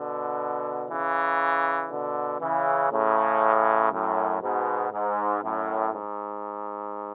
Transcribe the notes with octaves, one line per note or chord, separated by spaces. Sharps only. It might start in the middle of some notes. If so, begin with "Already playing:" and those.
Already playing: B2 D3
C#3 E3
B2 D3
C#3 E3
A2 C#3
F#2 A2
G#2 B2
G#2
F#2 A2
G#2